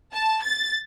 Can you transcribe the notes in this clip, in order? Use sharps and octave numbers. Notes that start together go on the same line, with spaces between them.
A5
A6